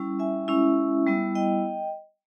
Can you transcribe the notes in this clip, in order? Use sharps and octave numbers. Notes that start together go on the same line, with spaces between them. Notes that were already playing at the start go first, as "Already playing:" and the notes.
Already playing: G3 C#4 E4
E5 G#5
G#3 C#4 E4
G3 B3 E4
D#5 G5